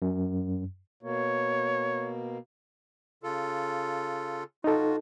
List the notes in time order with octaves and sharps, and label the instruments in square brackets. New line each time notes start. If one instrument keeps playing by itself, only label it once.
[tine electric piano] F#2
[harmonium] B2 A#3 [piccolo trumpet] C#5
[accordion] C#3 F4 A4
[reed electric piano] D#4 A4 [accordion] F4 F#4